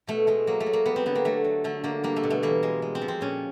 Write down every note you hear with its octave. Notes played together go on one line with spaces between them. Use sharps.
B2 A3
G#3 A3
F#3 A#3
A3
F#3
A#3
G3 B3
C4
D3 B3
A#3
F#3 A3
F#3
D3 A3
D3 A#3
G3 A#3
A3
B2
A3
E3 A#3
G#3
G#3
C4
F3
C4
A#2 C#4